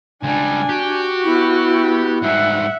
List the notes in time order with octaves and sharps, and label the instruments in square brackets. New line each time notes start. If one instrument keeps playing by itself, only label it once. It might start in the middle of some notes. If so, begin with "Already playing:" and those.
[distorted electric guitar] C#2 G3 [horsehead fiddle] D4 G#5
[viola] F#4 [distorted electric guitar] G4
[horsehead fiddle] B3 [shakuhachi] E4
[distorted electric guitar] G#2 G3 [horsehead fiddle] E5 F#5